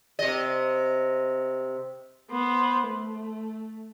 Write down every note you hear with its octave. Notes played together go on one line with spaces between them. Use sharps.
C3 D#5
B3 C5
A3